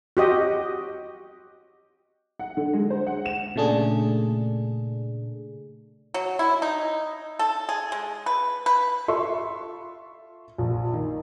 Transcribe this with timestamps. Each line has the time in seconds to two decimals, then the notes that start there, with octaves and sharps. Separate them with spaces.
0.17 F#4 G4 D#5
2.39 F#5
2.57 D3
2.73 G#3
2.90 C5
3.07 F#5
3.26 E7
3.56 A#2 C#3 A3 D4 G#4
6.14 F#3
6.39 E4
6.62 D#4
7.39 A4
7.69 G#4
7.92 G#3
8.26 B4
8.66 B4
9.08 F4 A4 E5 C6 C#6
10.58 A#1
10.93 D#3